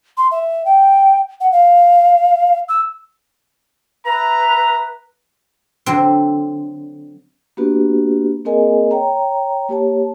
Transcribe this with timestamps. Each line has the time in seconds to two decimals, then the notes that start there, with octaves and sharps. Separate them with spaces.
0.17 C6
0.31 E5
0.65 G5
1.41 F#5
1.52 F5
2.69 E6
4.06 B4 E5 A#5
5.86 D3 F#3 C4
7.57 A#3 B3 D4 F#4 G4 B4
8.45 A#3 C4 G#4 A#4 D#5 G#5
8.91 C#5 G5 A#5
9.69 A#3 G4 C#5 A5